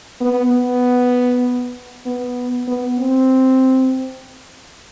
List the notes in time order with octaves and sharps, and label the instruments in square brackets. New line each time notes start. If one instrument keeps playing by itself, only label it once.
[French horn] B3
B3
B3
B3
C4